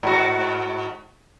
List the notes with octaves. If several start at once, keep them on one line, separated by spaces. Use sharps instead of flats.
G#2 F#4